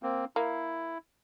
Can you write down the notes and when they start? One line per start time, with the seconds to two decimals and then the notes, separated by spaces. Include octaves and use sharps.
0.03 A#3 C4
0.36 A#3 E4